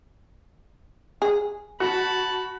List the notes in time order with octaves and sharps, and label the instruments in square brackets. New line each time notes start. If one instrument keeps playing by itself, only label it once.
[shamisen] G#4
[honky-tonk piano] F#4 [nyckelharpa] A5 B5